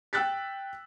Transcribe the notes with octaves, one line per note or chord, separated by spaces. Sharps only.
G5 E6 F#6 A6 B6